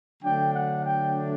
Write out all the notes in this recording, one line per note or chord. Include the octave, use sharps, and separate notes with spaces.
D3 F#3 A3 D4 G5
F#5
G5